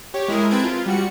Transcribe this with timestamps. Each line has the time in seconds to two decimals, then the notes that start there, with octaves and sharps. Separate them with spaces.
0.14 G4 C#5
0.28 G#3 E4 G#4 A#4
0.51 C4 B4 A5 G#6 D7
0.64 F4
0.86 G3 F#4 C#7